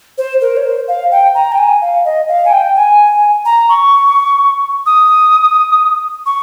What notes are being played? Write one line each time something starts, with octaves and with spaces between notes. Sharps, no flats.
C5
A#4
C#5
C5
F5
G5
A#5
G5
G#5
F5
D#5
F5
G#5
G5
G#5
A#5
C#6
D#6
C#6